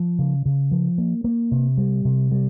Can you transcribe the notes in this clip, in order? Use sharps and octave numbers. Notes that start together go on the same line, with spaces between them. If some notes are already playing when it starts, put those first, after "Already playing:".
Already playing: F3
C#3
C#3
F3
A#3
A#3
C3
G3
C3
G3